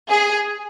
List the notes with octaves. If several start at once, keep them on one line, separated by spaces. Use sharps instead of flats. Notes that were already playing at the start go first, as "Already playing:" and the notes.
G#4